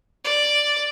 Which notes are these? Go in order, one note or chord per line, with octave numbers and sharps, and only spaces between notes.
D5